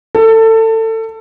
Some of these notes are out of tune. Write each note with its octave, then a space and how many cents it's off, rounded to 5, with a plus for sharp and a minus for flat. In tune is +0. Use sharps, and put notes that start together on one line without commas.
A4 +25